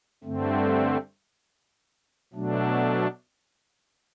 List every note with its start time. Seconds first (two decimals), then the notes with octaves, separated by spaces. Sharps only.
0.24 G2 D3 A3 C4
2.33 B2 F#3 A3 D4